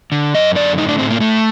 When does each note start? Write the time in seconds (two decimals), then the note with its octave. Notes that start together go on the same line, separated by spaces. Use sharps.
0.12 D3
0.34 F#2 D#5
0.55 D3 D5
0.78 A2 D#4
0.89 D4
0.99 A2 C4
1.10 A#3
1.21 A2 A3